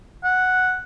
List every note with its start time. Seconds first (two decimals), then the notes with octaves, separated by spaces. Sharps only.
0.23 F#5